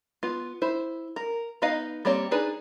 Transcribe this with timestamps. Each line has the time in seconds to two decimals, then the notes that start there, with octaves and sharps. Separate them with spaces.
0.23 B3 F4
0.62 E4 C5
1.16 A#4
1.62 B3 D#4 B4 D#5 F5
2.05 G3 A#3 C4 C#5
2.31 D4 D#4 G#4 B4